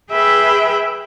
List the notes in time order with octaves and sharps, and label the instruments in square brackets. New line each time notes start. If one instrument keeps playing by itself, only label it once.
[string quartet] G#4 B4 E5 G5 B5